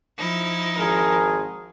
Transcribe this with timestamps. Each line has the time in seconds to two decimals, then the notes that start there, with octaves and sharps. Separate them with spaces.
0.17 F3 D#4 E4
0.77 G#1 G#4 A#4